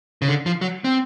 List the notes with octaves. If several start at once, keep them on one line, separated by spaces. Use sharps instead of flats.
C#3
D3
F3
F#3
C4